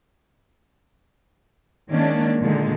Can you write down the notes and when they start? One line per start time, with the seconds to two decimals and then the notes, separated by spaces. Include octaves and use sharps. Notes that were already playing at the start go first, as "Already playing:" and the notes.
1.89 D#3 G#3 A#3 C#4 D4
2.40 A#2 D3 D#3 G#3